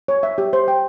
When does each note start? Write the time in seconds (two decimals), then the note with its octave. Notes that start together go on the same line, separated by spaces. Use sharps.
0.08 C#5
0.23 E5
0.38 G4
0.53 C5
0.68 G5